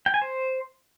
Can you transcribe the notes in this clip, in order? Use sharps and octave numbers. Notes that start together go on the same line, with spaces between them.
G5
G#5
C5